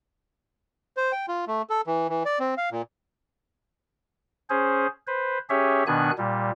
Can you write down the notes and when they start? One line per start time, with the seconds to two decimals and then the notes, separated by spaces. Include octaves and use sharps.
0.97 C5
1.12 G5
1.28 F4
1.48 A3
1.70 A4
1.87 E3
2.09 E3
2.25 D5
2.40 C4
2.58 F5
2.72 A#2
4.50 C#4 G#4 C5
5.07 B4 C5
5.50 C#4 G4 G#4 C#5 E5
5.87 B2 D#3 B3 D4 G#5 F#6
6.18 A#2 G3